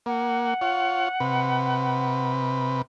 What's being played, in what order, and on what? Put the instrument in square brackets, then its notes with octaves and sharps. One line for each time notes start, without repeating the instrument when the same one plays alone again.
[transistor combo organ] A#3 [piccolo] F#5
[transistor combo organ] F4 C#5
C3 B4